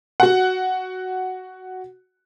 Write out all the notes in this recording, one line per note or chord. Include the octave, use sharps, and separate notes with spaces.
F#4 F#5